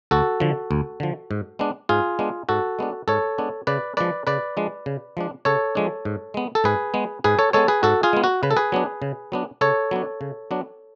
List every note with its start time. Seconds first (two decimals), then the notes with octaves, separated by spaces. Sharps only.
0.11 D2 F#4 A4
0.40 D3 F3
0.71 D2
1.00 D3 F3
1.31 G#2
1.59 G#3 B3 D4
1.89 G#2 F4 G#4
2.19 G#3 B3 D4
2.49 G#2 F#4 A4
2.79 G#3 B3 D4
3.08 G#2 A4 C#5
3.38 G#3 B3 D4
3.67 C#3 B4 D5
3.97 F3 G#3 D4 B4 D5
4.27 C#3 B4 D5
4.57 F3 G#3 D4
4.86 C#3
5.17 F3 G#3 D4
5.45 C#3 A4 C#5
5.75 F3 G#3 D4
6.05 G#2
6.34 G#3 B3
6.55 A4
6.64 G#2 G#4 B4
6.94 G#3 B3
7.24 G#2 G#4 B4
7.39 A4 C#5
7.53 G#3 B3 A4 C#5
7.68 G#4 B4
7.83 G#2 F#4 A4
8.03 F4 G#4
8.13 G#3 B3
8.24 F#4
8.43 C#3 B4
8.51 A4
8.57 G#4 B4
8.72 F#3 B3 D4
9.02 C#3
9.32 F#3 B3 D4
9.61 C#3 A4 C#5
9.91 F#3 B3 D4
10.21 C#3
10.51 F#3 B3 D4